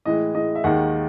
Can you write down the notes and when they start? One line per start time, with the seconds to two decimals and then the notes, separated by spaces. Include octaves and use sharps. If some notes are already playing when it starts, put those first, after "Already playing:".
0.05 A2 E3 G#3 D#5
0.35 A2 E3 G#3 D#5
0.55 E5
0.64 D#2 D#3 G#3 F#5